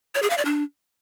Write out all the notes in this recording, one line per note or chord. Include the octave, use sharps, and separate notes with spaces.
C#5
G#4
F5
D5
D4